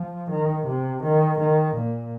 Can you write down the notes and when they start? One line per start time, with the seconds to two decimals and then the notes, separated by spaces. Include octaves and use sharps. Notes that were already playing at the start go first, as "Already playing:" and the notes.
Already playing: F3
0.30 D#3
0.67 C3
1.03 D#3
1.39 D#3
1.75 A#2